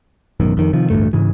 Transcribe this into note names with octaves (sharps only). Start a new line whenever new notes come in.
A1 F#2 B2 D#3
F2 D#3
C3 D#3 F3
A1 D2 G2 A3
G#2 C#3 E3